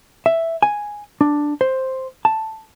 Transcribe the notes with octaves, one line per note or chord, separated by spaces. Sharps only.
E5
G#5
D4
C5
A5